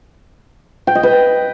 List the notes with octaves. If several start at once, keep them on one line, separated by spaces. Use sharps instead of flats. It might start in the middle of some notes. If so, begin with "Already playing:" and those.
G5
D#5
B4